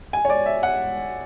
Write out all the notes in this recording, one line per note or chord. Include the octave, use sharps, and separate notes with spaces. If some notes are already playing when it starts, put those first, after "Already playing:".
G#5
C#5
D5
E5
F#5